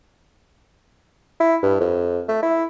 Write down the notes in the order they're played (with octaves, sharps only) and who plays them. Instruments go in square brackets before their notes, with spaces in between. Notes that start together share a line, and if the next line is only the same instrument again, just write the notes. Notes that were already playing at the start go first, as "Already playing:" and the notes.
[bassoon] E4
G2
F2
A3
E4